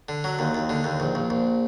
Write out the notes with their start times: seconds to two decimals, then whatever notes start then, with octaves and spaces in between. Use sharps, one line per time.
0.09 D3
0.24 F#3
0.39 D#2
0.55 D#2
0.70 D3
0.84 D#2
1.00 A#1
1.15 A#1
1.30 A#1